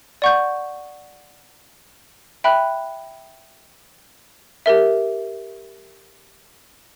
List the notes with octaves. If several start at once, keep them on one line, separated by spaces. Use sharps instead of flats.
D5 F#5 C#6 G6
E5 G5 B5 F#6
G4 A#4 E5